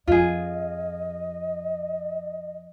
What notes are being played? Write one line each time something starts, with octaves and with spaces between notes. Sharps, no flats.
F2 F4 G#4 D#5